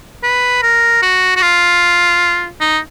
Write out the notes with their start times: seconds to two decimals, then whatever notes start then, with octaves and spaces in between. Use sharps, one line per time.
0.23 B4
0.62 A#4
1.02 F#4
1.36 F#4
1.41 F4
2.60 D#4